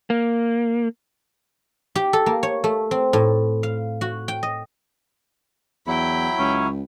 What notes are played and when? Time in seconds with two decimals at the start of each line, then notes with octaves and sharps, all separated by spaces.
0.10 A#3
1.96 G4
2.13 A4
2.26 A#3
2.43 C#5
2.64 A3
2.91 C4
3.13 A2
3.63 F5
4.01 F#4
4.28 G5
4.43 D#5
5.87 E2 F#3 E4 G5 B5
6.39 C#2 C#4